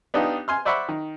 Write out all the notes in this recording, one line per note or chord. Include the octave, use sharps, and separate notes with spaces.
B3 D4 D#4 F4 G4
G#5 C6 F6
C5 D5 E5 F#5 B5 C#6
D#3